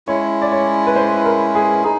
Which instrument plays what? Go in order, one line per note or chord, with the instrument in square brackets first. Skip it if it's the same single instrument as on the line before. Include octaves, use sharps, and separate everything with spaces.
[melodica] G#3 C#4 E4 [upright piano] C#5
[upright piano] D5
C#5
B4
C5
A#4
G#4
[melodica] D#4 [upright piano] G#4